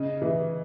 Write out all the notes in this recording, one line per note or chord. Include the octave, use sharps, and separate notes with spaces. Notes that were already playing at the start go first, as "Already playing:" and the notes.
Already playing: C#3 D#5
E3